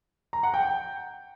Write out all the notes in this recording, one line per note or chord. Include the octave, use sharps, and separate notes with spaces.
A#5
F#5
G5